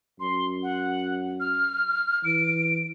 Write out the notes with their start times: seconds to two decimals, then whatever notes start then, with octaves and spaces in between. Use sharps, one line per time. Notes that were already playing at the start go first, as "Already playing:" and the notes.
0.20 F#2 C6
0.63 F#5
1.40 F6
2.24 E3 D7